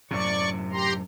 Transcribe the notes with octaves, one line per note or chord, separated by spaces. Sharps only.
F#2 A2 C3 D5 C#6
G4 A#5 C6